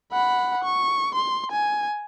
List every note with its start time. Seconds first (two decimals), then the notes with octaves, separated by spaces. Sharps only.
0.12 F#5 B5
0.64 C#6
1.15 C6
1.51 G#5